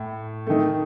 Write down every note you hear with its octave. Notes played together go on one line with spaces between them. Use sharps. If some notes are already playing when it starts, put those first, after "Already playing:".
Already playing: A2
D#3 A3